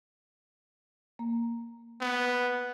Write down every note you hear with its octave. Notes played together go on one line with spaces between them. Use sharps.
A#3
B3